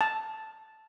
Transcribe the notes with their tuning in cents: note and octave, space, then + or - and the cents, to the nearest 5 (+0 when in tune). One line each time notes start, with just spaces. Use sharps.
A5 -5